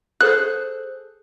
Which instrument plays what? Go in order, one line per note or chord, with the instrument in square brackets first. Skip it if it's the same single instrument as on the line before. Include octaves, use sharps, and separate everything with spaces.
[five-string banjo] G#4 A4 C5 [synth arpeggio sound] F#6